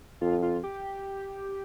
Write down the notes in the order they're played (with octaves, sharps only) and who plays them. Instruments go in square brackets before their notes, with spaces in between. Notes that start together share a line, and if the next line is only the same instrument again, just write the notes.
[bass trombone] F2 [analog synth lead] F4
[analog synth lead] F4
G4